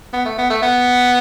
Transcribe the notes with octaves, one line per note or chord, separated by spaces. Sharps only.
B3
A3
B3
A3
B3